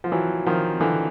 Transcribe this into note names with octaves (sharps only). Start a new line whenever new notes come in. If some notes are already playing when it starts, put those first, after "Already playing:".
F3
E3 F#3
D#3 F3
D3 E3